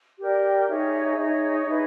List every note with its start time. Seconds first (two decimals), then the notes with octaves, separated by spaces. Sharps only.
0.19 G4 A#4 D5 G5
0.67 D#4 G#4 C#5 E5
1.17 D#4 G#4 C#5 E5
1.66 D#4 G#4 B4